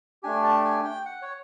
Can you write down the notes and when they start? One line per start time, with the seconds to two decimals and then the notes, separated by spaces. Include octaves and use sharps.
0.23 A3 D4 G4 G#5
0.44 A5
0.65 G#5
0.85 G5
1.06 F#5
1.22 C#5